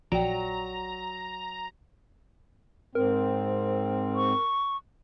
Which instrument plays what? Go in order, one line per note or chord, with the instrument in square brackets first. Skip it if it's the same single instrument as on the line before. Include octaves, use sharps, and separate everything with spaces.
[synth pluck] A#1 [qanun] F#3 [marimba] D5 G5 [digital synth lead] A#5
[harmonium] G#2 C4 [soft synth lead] A#4
[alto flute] C#6